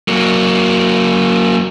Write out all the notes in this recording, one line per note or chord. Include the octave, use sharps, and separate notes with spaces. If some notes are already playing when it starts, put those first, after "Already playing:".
F#3 A#3